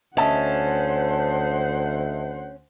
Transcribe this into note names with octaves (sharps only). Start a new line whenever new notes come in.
D2 C#4 C5 D#5 E5 F#5 A5